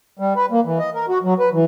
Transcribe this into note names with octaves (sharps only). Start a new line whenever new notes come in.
G3
B4
A#3
E3
D#5
A#4
F#4
F#3
B4
E3